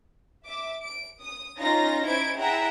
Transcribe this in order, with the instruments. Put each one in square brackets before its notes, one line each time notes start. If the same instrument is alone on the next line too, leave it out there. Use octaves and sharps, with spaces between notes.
[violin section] E5 D6
D7
D#6
C#4 D#4 F4 A#5 A#6
C#4 D#4 E4 C5 G#6 D7
E4 G#4 E5 F#5 G5 A#5